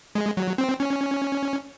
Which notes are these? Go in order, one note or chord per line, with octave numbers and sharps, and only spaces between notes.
G#3
F#3
C4
C#4